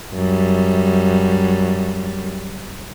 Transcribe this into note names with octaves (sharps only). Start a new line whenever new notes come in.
F#2 G3